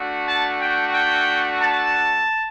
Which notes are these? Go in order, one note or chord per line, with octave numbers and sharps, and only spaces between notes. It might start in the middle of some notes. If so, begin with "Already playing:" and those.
Already playing: A3 D4 F#4
A5
G5
G5
A5